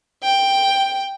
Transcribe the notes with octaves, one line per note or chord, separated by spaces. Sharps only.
G5